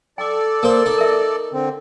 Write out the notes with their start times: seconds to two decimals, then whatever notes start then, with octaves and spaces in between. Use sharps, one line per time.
0.18 A4 D5 G5 D6
0.63 A#3 A#4 C5
0.86 D#4
0.98 A#4 E5
1.53 D3 C4